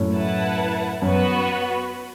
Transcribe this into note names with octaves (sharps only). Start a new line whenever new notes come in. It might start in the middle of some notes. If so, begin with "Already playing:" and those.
Already playing: F#2 A2
E4 B4 F#5 A5
F#2 B3 F#4 B4